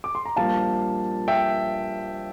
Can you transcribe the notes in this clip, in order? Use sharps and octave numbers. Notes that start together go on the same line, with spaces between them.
D6
C6
A#5
A#1 A#2 G3 A#3 F5 A5
E5 G5